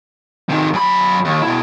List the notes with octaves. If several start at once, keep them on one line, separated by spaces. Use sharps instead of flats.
C3 D#3
F#2 B5
D#2
B2 E4